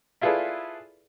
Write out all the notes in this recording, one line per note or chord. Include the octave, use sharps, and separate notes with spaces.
E4 F4 G#4 A4 B4 D5